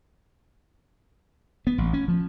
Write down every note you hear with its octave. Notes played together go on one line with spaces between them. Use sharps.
B3
A1
C#4
F3